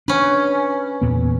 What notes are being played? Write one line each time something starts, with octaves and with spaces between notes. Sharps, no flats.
C#4 D4 B4
E2 A#2 B3